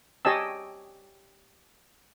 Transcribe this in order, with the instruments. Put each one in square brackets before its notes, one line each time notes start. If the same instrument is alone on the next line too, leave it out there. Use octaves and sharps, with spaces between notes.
[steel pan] G4 C#5 D#5 G#5 A5 E6